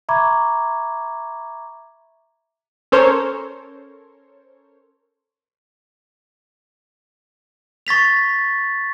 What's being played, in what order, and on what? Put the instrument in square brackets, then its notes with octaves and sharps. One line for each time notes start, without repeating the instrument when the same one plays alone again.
[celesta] E5 A#5 B5 C#6 D6 G#6
[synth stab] C#4 A4 A#4 C5 C#5
[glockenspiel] C#6 A6 B6 F7